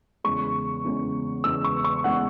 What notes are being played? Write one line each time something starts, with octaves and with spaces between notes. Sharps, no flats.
E2 C#3 G#3 C#6
E2 C#3 G#3
E2 C#3 G#3 E6
C#6
C#6
E2 C#3 G#3 F#5